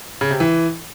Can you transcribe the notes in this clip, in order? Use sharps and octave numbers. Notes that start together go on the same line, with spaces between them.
C#3
C3
E3